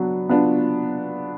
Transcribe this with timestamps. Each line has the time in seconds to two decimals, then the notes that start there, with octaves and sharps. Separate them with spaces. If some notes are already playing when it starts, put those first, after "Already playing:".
Already playing: F#3 B3 D4
0.29 B3 D4 F4